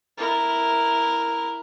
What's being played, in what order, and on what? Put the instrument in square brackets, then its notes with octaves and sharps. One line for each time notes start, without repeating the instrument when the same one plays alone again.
[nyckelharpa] E4 A#4